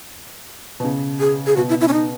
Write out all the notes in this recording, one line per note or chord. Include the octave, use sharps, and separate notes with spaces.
B2
C#3
G#4
G#4
B2 F#4
E4
E4
C#4
D#4